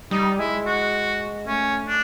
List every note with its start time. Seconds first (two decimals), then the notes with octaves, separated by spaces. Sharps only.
0.11 G3 D#4
0.39 G#3 E4
0.66 F#4
1.47 A3 C#4
1.88 D4